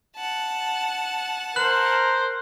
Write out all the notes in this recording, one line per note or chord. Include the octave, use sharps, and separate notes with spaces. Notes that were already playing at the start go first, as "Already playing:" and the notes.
F#5 A5
A#4 C5 F#6 F#7